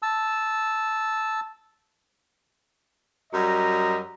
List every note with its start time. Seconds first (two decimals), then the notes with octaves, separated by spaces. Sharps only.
0.02 A5 E6
3.33 F#2 G3 F#4 D#5 A#5